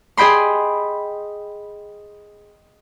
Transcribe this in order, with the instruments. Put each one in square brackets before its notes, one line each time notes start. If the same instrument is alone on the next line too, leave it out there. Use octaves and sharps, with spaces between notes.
[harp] G#4 D#5 G5 B5 C6